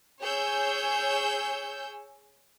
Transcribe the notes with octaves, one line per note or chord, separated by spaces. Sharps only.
G#4 C#5 E6 G6